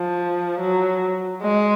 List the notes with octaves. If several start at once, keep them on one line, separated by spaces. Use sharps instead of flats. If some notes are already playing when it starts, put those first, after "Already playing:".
Already playing: F3
F#3
G#3